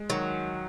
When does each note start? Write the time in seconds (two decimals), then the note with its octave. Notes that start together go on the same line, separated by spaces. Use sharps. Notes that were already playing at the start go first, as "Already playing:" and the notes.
Already playing: G#3
0.10 D#3 F#3